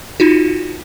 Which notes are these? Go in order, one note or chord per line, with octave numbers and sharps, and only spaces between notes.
D#4 F4 F#4